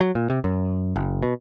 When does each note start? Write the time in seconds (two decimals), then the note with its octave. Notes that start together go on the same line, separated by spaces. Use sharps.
0.01 F#3
0.15 A#2
0.30 C3
0.44 F#2
0.96 F#1
1.23 B2